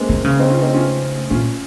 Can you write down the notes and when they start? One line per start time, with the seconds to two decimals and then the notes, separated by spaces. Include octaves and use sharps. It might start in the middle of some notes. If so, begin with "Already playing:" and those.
Already playing: G#3 A#3 C4 C#4
0.09 D#3
0.24 C#3
0.39 C4 D#4
0.50 C#4 F4
0.62 C4 D#4
0.74 C#4 F4
1.30 A#2 C#4 F4